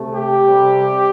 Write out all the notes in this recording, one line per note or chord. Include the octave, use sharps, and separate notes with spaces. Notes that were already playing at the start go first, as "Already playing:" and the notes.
Already playing: C3 A3
G4
C3 G3